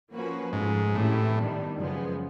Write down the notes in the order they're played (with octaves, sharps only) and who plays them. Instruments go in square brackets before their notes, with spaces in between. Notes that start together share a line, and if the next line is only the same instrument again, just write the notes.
[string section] F3 A#3 C#4 F#4 B4
[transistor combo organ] G#2 [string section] C#3 F3 A3
[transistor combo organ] A2 [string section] C3 E3 A3 C#4 E4
[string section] D#3 G3 B3 D4
F#2 C#3 F3 G#3 B3